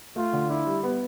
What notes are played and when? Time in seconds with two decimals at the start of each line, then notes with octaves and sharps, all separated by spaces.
0.16 A3 F4
0.33 D3
0.50 D4 E4
0.66 G3
0.83 B3